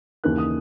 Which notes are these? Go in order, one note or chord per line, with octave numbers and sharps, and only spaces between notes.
D#2 C#3 E3 A#3 D#4 F#6
D#6